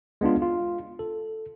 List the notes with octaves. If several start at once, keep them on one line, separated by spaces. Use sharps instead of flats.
G#3 B3 D4 F4
F4
A4